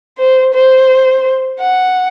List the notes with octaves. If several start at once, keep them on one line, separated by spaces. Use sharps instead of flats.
C5
C5
F#5